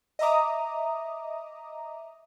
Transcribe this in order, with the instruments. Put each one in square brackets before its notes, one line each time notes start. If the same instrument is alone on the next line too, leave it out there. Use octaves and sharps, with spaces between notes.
[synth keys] D#5 E5 A#5 D6 D#6